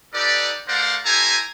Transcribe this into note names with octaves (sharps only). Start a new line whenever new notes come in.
D#4 G4 A4 B4 D5
A3 A#4 C5 D5 F5 F#5
E4 G4 A4 C5 G#5 A#5